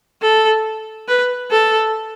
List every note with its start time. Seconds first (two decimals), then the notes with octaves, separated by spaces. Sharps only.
0.22 A4
1.08 B4
1.51 A4